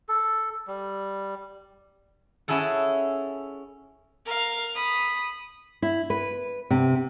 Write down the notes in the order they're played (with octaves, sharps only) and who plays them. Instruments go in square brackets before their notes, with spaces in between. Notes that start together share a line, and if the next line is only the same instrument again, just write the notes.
[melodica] A4
G3
[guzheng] C#4 E4 G#4 A4 F#5
[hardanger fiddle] A#4 F5
B5 D#6
[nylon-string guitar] E4
B4
C3